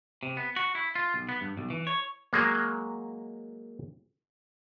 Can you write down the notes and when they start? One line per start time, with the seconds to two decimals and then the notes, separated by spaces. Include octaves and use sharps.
0.23 C3
0.37 B3
0.56 F#4
0.75 E4
0.95 F4
1.14 B1
1.29 B3
1.41 G2
1.57 B1
1.70 E3
1.87 C#5
2.33 F#3 G#3 A#3